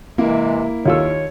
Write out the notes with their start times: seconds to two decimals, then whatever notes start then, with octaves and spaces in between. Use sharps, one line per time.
0.18 C3 E3 G#3 A#3 E4
0.86 D#2 F4 C#5 E6